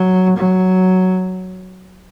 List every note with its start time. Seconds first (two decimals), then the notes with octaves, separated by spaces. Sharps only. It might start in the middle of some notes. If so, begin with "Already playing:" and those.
Already playing: F#3
0.37 F#3